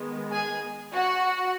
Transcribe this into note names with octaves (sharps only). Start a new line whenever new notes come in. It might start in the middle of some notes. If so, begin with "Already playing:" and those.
Already playing: D#3 G#3 B3
G#4 G#5
F#4 F#5